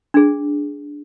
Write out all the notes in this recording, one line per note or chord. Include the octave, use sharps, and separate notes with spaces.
D4 G#4